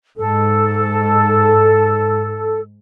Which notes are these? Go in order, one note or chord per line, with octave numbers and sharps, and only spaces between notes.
G#2 A4